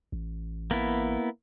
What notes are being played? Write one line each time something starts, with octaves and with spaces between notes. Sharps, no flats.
A1
A#3 B3 E4